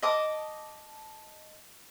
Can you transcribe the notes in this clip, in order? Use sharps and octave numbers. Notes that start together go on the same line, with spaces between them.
D#5 A5 D6 D#6